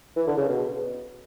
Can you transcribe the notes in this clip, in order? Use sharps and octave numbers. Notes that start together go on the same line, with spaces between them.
E3
D3
C#3
B2